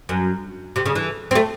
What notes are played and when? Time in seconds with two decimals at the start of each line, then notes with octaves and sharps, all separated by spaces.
0.09 F#2
0.76 C3
0.86 C#3
0.95 E3
1.31 C4
1.35 A3